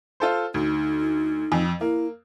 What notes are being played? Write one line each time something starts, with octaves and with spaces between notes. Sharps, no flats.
F4 A4 C5
D2 D#4
F2
A#3 E4